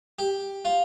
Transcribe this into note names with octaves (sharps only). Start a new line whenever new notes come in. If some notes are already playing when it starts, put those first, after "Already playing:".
G4
F4